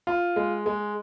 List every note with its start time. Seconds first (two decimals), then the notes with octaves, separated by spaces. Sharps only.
0.07 F4
0.36 G#3
0.66 G#3